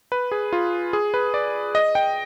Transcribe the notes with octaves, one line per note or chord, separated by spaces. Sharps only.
B4
G#4
F4
G#4
B4
D5
D#5
G5